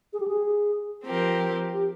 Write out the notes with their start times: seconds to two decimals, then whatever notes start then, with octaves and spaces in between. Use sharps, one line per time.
0.13 G#4
0.20 G4
0.28 G#4
1.04 F3 C4 G4 A#4
1.73 G4